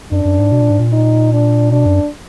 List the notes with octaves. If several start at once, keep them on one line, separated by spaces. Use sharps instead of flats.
F#2 D4
F#2
G#2
B2
A#2
G#2
A#2
D#4
D4
B2 D4
F#2